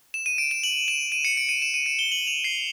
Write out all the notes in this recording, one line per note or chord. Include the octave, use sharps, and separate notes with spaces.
E7
D#7
D7
E7
F#7
E7
D#7
C#7
D7
D#7
E7
D#7
D7
G7
F#7
F7
C7